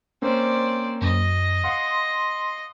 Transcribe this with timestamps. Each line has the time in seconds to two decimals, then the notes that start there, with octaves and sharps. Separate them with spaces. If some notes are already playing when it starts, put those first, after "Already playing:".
0.22 A#3 C4 C#4 C5 D5
1.01 F#2 D#5
1.64 F5 F#5 C6 D#6